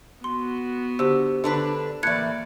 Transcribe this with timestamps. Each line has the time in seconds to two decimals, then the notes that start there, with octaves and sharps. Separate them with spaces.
0.24 B3 F#4 C6
0.99 D3 G4 C5 E6
1.44 D3 D4 B4
2.03 A2 E3 A#3 D5 F#6 G#6 C#7